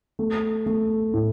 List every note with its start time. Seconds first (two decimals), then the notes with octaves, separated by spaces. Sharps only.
0.19 A3
0.66 A3
1.13 A2